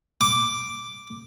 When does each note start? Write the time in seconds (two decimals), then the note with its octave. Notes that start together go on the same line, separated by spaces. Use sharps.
0.21 D6